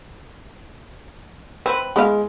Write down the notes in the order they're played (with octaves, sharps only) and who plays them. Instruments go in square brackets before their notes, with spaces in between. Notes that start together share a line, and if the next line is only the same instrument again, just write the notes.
[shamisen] C4 [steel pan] B4
[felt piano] G#3 [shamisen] B3 E4 F5